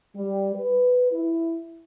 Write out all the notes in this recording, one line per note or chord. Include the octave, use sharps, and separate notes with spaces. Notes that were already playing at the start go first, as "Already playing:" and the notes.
G3
B4
E4